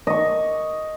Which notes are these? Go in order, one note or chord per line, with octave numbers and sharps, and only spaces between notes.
D#5 C#6